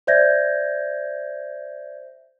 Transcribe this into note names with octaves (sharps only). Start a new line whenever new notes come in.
C5 D5 E5 G6 G#6 A#6